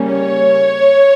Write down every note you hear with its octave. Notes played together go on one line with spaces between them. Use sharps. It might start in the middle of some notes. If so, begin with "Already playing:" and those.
Already playing: C#3 G3 A#3 C#4
C#5